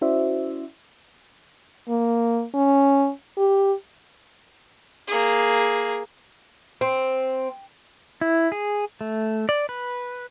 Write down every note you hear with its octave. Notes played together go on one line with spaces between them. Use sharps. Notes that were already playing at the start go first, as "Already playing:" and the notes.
C#4 E4 F#4 C5 D5 E5
A#3
C#4
G4
A#3 G#4
C4
E4
G#4
A3
D5
B4